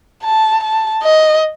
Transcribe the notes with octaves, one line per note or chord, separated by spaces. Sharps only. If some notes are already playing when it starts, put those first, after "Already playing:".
A5
A5
D#5